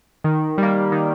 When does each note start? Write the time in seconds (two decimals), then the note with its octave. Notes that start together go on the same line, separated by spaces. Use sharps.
0.24 D#3
0.58 G3
0.63 A#3
0.92 D#3